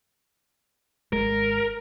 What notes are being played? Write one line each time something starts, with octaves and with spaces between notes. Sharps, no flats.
G#1 G#3 A#4